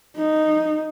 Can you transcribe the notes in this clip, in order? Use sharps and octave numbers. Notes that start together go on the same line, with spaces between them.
D#4